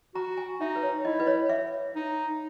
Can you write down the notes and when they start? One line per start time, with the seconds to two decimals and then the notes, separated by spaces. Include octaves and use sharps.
0.15 F#4 A#5
0.37 G#5
0.60 D#4 E5
0.76 B4
0.83 C#5
1.05 E4 D#5
1.20 B4
1.27 C#5
1.49 E5
1.95 D#4